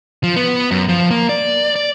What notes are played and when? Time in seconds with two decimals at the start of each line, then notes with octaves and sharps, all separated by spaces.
0.24 F3
0.36 B3
0.71 F#2
0.89 F3
1.11 A#3
1.29 D5
1.76 D5